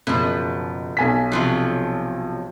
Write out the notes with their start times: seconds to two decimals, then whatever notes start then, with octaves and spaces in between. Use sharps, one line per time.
0.07 F#1 B2 F3
0.97 B1 G#5 B6
1.32 C3 F3 F#3